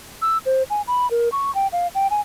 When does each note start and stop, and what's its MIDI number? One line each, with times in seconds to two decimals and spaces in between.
0.22 0.38 88
0.46 0.63 72
0.70 0.82 80
0.87 1.10 83
1.11 1.29 70
1.32 1.54 85
1.55 1.67 79
1.72 1.87 77
1.95 2.07 79
2.11 2.21 80